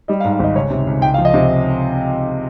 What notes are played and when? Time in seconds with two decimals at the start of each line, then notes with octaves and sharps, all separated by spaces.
0.08 G3 D#5
0.20 F5
0.24 G#2
0.33 F5
0.39 G#1 D#5
0.55 C#2 C#5
0.70 C3
0.87 C#2
1.02 C#2 G5
1.14 F5
1.18 F3
1.25 D#5
1.34 C3